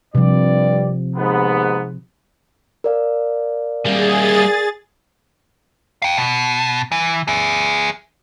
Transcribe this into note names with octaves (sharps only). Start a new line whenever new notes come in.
G2 C3 F3 G3 D5
D#2 G#2 B3
A#4 D5 F5
G3 A#3 G#4 A6
F5 G5
B2
E3
G#4 E5